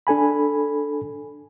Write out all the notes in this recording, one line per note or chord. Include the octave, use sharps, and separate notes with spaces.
D4 A4 G#5 B5